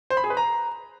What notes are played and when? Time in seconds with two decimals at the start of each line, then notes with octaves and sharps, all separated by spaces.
0.10 C5
0.17 B5
0.24 G#4
0.30 B4
0.37 A#5